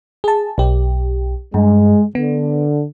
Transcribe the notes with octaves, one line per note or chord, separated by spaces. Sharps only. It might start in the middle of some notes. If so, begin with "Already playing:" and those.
G#4 A5
B1 G4
G2 G#3
D3 B3